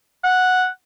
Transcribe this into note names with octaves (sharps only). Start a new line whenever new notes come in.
F#5